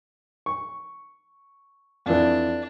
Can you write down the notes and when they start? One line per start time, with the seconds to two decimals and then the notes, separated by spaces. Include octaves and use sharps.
0.46 C#6
2.06 F2 E3 D4